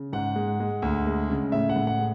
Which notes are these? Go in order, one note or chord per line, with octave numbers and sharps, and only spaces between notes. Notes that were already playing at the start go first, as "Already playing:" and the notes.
Already playing: C#3
G#2 F#5
G#3
G#3
D2
G#3
C#3
A2 E5
F#5
A2
F#5
G#3